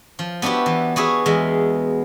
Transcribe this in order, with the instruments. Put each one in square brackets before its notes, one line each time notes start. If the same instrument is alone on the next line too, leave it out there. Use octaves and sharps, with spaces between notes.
[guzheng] F3
B3 D4 E4 F#4 G4
E3
B3 F#4 G#4 E5
E2 G#3 E5